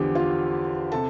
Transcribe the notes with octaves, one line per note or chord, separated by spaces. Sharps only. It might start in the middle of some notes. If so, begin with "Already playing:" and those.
Already playing: E2 D3 F3 G4
F4 F5
C3 A4 A5